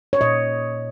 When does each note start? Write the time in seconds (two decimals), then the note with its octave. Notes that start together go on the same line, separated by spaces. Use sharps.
0.13 C#5
0.21 A#2 D#5